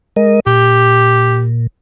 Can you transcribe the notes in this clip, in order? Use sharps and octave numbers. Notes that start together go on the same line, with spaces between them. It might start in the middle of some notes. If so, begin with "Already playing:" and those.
G#3 A#4 D#5
A#2 G4